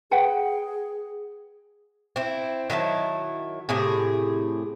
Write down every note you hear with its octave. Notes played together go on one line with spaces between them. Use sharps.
G#4 B4 F#5 G5
C4 E4
D#3 F#3 E4 A5
A2 C3 G#4